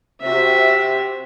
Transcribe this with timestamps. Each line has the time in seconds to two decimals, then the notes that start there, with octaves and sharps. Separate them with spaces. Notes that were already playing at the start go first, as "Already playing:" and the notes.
0.22 C3 F#4 E5